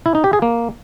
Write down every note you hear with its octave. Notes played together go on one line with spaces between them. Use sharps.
E4
D#4
G4
G#4
A#3